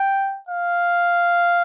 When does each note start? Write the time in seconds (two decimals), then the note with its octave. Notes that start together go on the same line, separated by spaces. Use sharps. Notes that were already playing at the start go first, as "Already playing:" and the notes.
Already playing: G5
0.49 F5